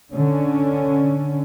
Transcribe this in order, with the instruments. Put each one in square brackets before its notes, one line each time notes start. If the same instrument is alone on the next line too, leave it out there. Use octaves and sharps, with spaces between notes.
[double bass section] D3 C#4